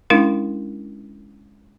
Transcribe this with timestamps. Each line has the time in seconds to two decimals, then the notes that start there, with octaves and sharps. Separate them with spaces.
0.10 G#3 C#4 D4 E4 A#4 F5